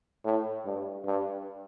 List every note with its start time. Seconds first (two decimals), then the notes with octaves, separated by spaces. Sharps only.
0.25 A2
0.66 G2
1.06 G2